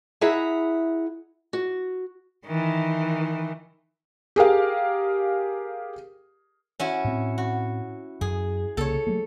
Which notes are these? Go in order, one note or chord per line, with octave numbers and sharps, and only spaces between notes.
E4 G#4 E5 F#5 A#5
F#4
D#3 E3
G4 G#4 A#4 F5
C#4 E4 F#4
A2 C4
F#4
F#2 G#4
C2 C#3 A#3 A4 C#5
F#3 A3 A#3